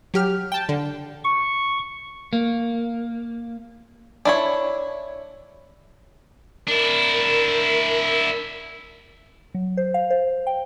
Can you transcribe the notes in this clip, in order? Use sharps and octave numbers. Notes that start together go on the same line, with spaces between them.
F#3 G4 F6
G5 A5
D3
C#6
A#3
D4 E4 C#5
D4 E4 A#4
F#3
C5
F5
C5
G5